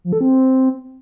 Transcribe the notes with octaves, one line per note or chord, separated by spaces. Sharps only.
F3
A4
C4